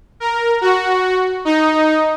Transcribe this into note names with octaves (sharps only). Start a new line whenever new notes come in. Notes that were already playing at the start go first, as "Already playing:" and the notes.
A#4
F#4
D#4